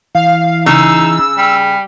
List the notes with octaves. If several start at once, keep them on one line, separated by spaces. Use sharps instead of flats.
E3 F5
C#3 D#4 E6
G3